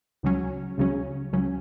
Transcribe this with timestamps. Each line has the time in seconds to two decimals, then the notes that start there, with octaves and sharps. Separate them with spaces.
0.23 C#2 C#3 F#3 C#4
0.78 C#2 C#3 F#3 C#4
1.33 C#2 C#3 F#3 C#4